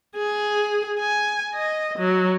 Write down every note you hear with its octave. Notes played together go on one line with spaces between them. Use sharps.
G#4
G#5
D#5
F#3